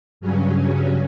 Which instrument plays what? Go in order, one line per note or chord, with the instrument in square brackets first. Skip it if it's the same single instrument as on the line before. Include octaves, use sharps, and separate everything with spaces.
[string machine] G2 C#3 F#3 C#4